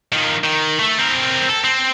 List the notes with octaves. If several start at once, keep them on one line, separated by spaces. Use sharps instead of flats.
D#3 F3
D#3
A3
C4 A#4
A4
C4